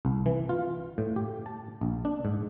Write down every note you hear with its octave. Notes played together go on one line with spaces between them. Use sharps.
C2
E3
F4
A2
G4
A5
A#1
D4
G#2